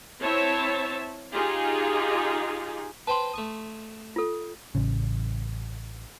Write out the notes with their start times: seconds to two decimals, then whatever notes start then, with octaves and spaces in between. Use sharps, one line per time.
0.21 C4 E4 C#5 E5 A5
1.33 D#4 F4 G4 G#4
3.07 B4 C5 G5 A5 C6
3.34 A3 C#6 D#6
4.16 F4 A4
4.75 A1 C#3